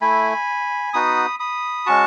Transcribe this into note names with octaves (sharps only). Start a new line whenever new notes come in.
A3 E4 G#5 B5
B3 D#4 F#4 B5 D#6
B5 D#6
G#3 C#4 F#4 A5 C#6